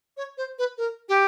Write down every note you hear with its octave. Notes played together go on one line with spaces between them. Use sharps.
C#5
C5
B4
A#4
G4